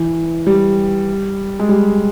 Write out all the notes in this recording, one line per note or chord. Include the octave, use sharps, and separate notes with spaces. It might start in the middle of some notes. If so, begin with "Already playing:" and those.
Already playing: E3
G3
G#3
G3